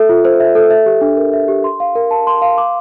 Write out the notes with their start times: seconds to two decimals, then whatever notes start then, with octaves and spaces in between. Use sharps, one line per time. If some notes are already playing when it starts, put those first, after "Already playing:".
Already playing: A4 E5
0.09 F4
0.25 C5
0.40 E5
0.55 A4
0.70 E5
0.86 G4
1.01 D4
1.17 A#4
1.33 E5
1.48 G4
1.64 C6
1.80 F5
1.95 A#4
2.11 A5
2.27 C6
2.42 F5
2.58 D6